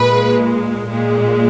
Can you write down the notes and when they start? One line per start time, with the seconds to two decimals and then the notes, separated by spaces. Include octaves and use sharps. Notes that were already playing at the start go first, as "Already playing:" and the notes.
Already playing: A#2 G#3 B4
0.88 A#2 G#3